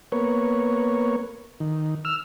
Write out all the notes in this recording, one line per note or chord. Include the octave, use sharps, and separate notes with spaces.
A#3 B3 C#5
D#3
E6 F6